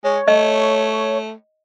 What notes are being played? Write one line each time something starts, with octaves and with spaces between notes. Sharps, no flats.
G#3 C#5
A3 D#5